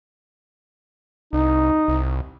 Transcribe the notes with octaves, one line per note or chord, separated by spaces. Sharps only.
C2 D#4
C2